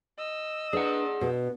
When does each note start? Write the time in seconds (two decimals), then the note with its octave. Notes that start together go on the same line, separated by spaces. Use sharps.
0.18 D#5 E6
0.73 D4 G#4 B4 F#5
1.21 B2 B4